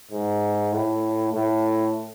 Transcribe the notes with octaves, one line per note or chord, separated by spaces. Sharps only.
G#2
A2
A2